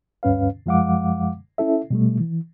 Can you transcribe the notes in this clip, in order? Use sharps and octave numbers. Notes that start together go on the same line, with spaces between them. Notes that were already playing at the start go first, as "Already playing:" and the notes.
D2 G2 C#4 B4 F5
F#2 F3 G#3 F5 F#5 D6
C#4 E4 A4 E5
B2 G3 A3
E3